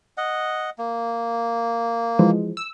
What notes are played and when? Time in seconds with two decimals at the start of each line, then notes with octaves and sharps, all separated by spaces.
0.17 D#5 F#5
0.78 A#3
2.19 E3 F3 G#3
2.57 E6